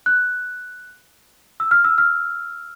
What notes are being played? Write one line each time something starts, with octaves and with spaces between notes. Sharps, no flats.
F#6
E6
F6
E6
F6